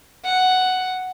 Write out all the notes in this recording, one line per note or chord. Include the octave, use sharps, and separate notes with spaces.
F#5